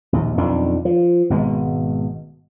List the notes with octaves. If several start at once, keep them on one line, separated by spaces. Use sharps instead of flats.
A#1 D#2
B1 F2 D#3 D4
F3
G#1 B2 G#3